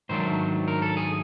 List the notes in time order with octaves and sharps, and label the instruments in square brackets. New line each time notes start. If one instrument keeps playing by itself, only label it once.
[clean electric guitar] G#2 D#3 F#3 A3 D4 C5
A#4
A4
G#4